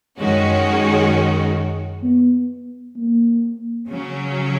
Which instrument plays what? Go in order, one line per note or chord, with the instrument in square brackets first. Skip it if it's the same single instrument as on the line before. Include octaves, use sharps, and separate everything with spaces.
[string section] F#2 D#3 G#3 C#4 F#4
[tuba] B3
A#3
[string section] C#3 F#3 C#4